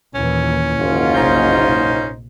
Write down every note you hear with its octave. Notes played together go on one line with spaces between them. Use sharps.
D#2 A#2 E3 C#4
F#1 D#2 G#2 F4
F1 A#1 A#2 D#4 C5